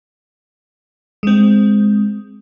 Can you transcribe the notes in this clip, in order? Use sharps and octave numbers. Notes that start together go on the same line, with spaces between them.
G#3 C4